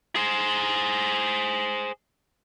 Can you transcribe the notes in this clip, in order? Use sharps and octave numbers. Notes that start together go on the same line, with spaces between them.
G#4 C5